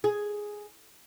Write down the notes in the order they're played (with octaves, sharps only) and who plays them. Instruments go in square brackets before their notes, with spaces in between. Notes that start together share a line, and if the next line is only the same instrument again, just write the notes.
[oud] G#4